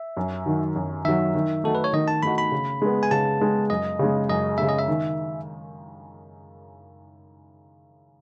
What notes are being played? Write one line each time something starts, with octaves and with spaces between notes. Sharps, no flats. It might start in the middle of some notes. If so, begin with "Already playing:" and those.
Already playing: E5
F#2
D#3 F#3
F#2
D#3 F#3 E5
D#3
A3 D#4 F#4 A4
B4
C#5
D#3 D#5
A5
A3 D#4 F#4 B5
B5
C#3
G#3 B3
G#5
C#3 A5
G#3 B3
F#2 D#5
C#3 G#3
F#2 D#5
C#3 G#3 E5
D#5
E5
D#3